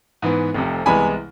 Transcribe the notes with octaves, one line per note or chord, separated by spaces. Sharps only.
G#2 E3 B3
F1 F2 C3
C2 C3 E3 G#3 B3 G#5 B5